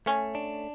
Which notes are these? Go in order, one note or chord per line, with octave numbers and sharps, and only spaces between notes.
A3 C#4
D4